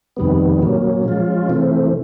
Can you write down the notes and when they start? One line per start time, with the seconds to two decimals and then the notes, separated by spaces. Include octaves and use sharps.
0.17 F2 C3 D#3 G3 B3
0.61 A#2 F#3 A#3 C#4
1.04 F3 G#3 C#4 F4
1.49 C3 E3 A3 C4